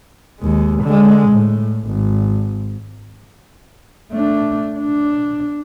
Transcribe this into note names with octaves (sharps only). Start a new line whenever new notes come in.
D#2 G#3
D3 G#3
A2
G#1
A3 D4
D4